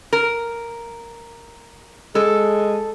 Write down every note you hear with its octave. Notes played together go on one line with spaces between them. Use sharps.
A#4
G#3 A4